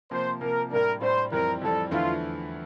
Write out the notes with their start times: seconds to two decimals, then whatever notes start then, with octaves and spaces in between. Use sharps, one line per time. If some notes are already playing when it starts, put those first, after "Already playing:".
0.11 C3 F3 A#3 C5
0.41 C3 F3 A#3 A#4
0.70 A2 G3 D4 A#4
1.01 A2 G3 D4 C5
1.32 F2 E3 G3 C4 A#4
1.61 F2 E3 G3 C4 A4
1.91 E2 D3 F3 A3 E4 F4